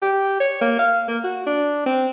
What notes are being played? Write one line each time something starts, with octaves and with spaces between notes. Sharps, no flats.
G4
C#5
A#3
F5
A#3
F#4
D4
C4